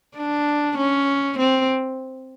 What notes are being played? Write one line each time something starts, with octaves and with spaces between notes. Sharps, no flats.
D4
C#4
C4